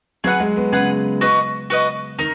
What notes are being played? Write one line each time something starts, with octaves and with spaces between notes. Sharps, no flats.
F#3 G#4 B4 F#5
G#3
B3
C#3 G#4 B4 F#5
F#4 B4 D#5
F#4 B4 D#5
D#3 D#4 A#4